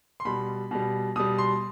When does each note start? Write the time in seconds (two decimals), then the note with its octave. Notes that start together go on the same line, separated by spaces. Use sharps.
0.20 C6
0.25 B2 G3 B5
0.71 B2 G3
1.16 B2 G3 D#6
1.38 C6